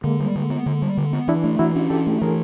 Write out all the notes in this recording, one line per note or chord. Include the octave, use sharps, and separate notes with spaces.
D3 G#3 A#3
G3
D3
B3
D3
G3
D3
B3
E3 D4 E4
A3
E3 E4 F#4
C#4
E3 G4 A4
A3
E3 G#4 A#4